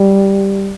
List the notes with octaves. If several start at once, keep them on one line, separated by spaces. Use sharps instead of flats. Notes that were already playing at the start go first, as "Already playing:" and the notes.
Already playing: G3